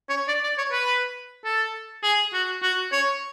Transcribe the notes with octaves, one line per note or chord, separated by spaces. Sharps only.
C#5
D5
D5
C#5
B4
A4
G#4
F#4
F#4
C#5